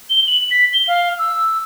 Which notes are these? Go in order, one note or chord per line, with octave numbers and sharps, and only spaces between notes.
G7
F#7
B6
G7
F5
E6